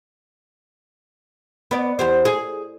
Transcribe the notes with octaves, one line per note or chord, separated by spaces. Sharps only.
B3 D5
E2 G4 C5
G#4